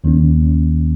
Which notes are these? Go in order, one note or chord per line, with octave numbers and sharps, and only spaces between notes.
D#2 D#3 A#3 C#4